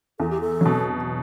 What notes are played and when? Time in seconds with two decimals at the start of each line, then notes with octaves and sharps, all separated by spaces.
0.19 E2 A4
0.30 G4
0.41 A4
0.61 B2 F#3